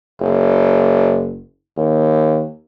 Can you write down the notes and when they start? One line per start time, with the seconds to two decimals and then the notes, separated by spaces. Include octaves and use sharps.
0.20 F#1
1.77 D#2